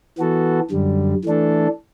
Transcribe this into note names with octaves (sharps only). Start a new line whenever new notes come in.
E3 B3 F#4 A4
F#2 D3 G3
E3 A3 D4 A4